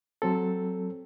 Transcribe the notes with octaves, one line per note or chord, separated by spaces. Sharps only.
F#3 C4 A4